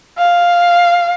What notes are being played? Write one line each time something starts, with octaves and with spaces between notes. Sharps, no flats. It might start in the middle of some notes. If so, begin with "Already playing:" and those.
F5